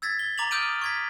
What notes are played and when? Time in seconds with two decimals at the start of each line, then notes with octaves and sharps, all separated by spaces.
0.02 E6 G#6 A6 B6
0.19 G7
0.38 A#5 D6 A6 F7 F#7
0.51 D6 D#6 F6 G6 D7 D#7
0.81 C#6 G#6 B6